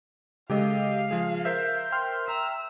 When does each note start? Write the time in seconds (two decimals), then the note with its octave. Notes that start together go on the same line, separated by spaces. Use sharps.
0.50 C#3 G#3 G4 A4 D#5 F5
1.11 F3 G#4
1.45 A#4 C5 E5 G6
1.92 G5 C6 F6
2.28 E5 A#5 E6